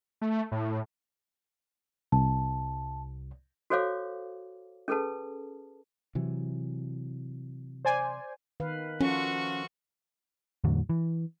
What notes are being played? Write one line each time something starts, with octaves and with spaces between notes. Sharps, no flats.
A3
A2
C2 A5
F#4 A4 C5 C#5 F5 D6
C#4 G#4 A4 B4 A5
C3 E3 F#3
C5 D5 G#5
D#3 B4 F5
F3 C#4 F4 F#4 A4 C#6
E2 A2 D3 F#3
E3